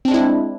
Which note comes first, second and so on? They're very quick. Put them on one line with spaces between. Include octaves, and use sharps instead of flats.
C4 D4 G#3 E4